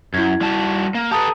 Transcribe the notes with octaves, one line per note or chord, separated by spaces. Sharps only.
F#2 E4 G#6
G3 F#4 A5
A#3
G4 A4 B4 A5 A#5 D#6